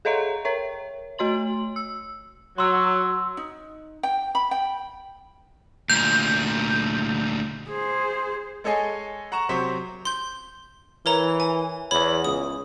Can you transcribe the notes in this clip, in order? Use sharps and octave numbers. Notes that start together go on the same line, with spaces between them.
G#4 A4 C#5 D#5 E5 A#5
A#4 C#5 E5
A3 F#4 C#5 C6 F#7
E6
F#3 C6 E6
D#4
G5
B5
G5
D2 A#2 G6
G#4 C5
G#3 A4 C#5 D#5 G#5 C7
F#5 A#5 C#6 E7
C3 F#3 C5 C#6 B6
C6 G6
E3 A#4 C#5 A#5
G#5
E2 C#5 B5
C#2 D#6